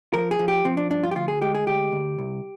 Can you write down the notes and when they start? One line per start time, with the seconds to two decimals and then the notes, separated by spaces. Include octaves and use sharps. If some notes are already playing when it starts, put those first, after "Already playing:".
0.13 F3 A#4
0.31 G#4
0.39 F3
0.48 G4
0.64 F3 C4
0.77 D4
0.90 G2 D4
1.03 F4
1.11 G4
1.15 D2 F4
1.28 G#4
1.41 G#3 G4
1.55 G#4
1.67 D2 G4
1.92 D2
2.18 C2